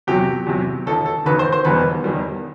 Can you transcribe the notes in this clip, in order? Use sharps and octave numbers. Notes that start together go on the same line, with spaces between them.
E2 C3 F#3 G4
E2 C3 F#3
E1 D#2 D#3 A4
A4
E1 D#2 D#3 B4
C5
C5
E1 E2 D#3 G3 B4
E1 E2 D#3 G3